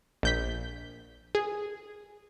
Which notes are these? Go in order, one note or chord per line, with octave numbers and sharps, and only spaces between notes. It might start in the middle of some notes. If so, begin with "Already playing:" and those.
A#1 G6 B6
G#4